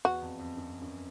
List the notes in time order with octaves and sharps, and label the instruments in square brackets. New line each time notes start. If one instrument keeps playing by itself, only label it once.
[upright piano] E2 [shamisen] F#4
[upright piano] F2
F2
F#2
F#2